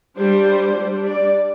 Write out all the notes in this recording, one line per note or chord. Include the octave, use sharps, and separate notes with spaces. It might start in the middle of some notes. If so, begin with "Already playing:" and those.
G3 D4 C5
G3 D4
D5